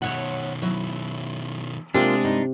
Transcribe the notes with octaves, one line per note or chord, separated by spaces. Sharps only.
B2 D#3 C#5 E5 F#5
F#3 E4 E5
C3 G#3 A#3 D4 F4 G#5
G2 D#4